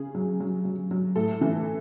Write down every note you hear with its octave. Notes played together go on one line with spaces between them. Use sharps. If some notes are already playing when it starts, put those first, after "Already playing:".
Already playing: C#3 G#4
F#3
F#3
F#3
F#3
A2 A4
E3